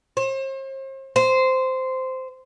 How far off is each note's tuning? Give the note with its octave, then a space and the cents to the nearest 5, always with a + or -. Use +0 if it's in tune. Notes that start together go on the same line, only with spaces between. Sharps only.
C5 +40
C5 -10